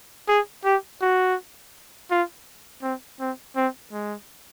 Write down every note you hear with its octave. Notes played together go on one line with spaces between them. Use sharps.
G#4
G4
F#4
F4
C4
C4
C4
G#3